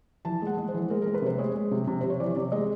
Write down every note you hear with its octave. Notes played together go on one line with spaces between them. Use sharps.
E3 A5
G#3 F#5
G#3
C5
E3
G#3 A#4
G#3 A#4
B4
C3 C5
G#3 C#5
G#3
C3
C3
C3 C5
C#5
E3 D5
C#5
C3 D5
G#3 D#5